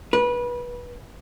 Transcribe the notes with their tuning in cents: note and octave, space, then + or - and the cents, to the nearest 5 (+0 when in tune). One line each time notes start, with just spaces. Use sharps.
B4 -25